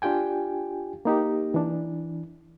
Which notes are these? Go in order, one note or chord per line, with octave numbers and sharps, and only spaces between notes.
D4 F4 G4 G5 G#5
A#3 D#4 G4
E3 D4